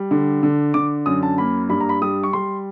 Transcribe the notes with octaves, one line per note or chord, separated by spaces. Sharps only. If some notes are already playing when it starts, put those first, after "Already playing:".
Already playing: G3
D3
D3
D3 D6
F#2 D#6
A5
A#3 B5
G2 B5
A#5
B5
G3 D#6
C#6
G3 C6